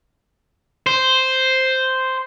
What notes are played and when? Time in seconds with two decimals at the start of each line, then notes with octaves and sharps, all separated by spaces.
0.87 C5